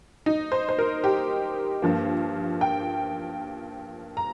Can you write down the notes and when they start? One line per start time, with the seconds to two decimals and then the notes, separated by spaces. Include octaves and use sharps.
0.26 D#4
0.52 C5
0.69 C5
0.79 A#4
1.04 G4
1.82 G2 F3 A#3
2.61 G5
4.17 A#5